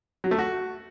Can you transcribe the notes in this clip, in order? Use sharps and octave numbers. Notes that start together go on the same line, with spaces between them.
F#3
A3
F#4